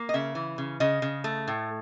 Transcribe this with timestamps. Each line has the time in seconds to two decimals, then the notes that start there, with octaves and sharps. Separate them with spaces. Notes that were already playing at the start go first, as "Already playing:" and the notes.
Already playing: A#3
0.09 D#5
0.14 C#3 E5
0.35 E3
0.58 C#3
0.80 C#3 D#5
1.02 C#3
1.24 A3
1.48 A2